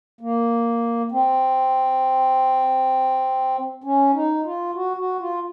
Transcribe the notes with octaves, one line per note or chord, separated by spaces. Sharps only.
A#3
C4
C#4
D#4
F4
F#4
F#4
F4